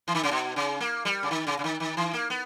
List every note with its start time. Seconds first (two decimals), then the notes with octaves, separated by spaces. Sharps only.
0.08 E3
0.15 D#3
0.23 C#3
0.31 B2
0.56 C#3
0.80 A#3
1.05 G3
1.23 C#3
1.31 D#3
1.47 C#3
1.59 C#3
1.64 D#3
1.80 D#3
1.97 E3
2.13 A#3
2.30 B3